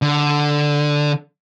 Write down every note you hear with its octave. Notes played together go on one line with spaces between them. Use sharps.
D3